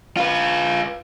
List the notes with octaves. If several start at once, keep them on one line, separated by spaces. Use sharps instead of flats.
F4 B4